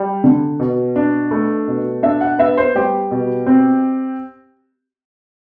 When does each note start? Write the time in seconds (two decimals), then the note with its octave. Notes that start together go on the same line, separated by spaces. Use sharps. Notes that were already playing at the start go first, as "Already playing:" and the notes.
Already playing: G3
0.24 D3
0.59 B2
0.96 D4
1.31 A3
1.68 B2
2.03 D4 E5
2.21 F#5
2.39 B3 E5
2.57 C5
2.75 G3 G4
3.11 B2
3.46 C4